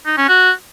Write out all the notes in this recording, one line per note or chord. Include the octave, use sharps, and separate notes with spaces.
D#4
C#4
F#4